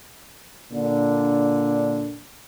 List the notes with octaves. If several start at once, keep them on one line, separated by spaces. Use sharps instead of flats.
A#2 D3 D4